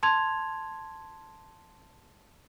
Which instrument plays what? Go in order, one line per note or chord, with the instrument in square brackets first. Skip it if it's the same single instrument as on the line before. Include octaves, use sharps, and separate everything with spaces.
[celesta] A5 C6 G#6 F7